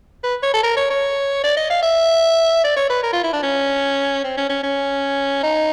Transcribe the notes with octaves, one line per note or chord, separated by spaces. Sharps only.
B4
C#5
A4
A#4
C#5
C#5
D5
D#5
F5
E5
D5
C#5
B4
A#4
F4
E4
D4
C#4
C4
C#4
C#4
C#4
D#4